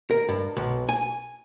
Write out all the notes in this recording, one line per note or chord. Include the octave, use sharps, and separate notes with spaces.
A#4
G2
B1
G#5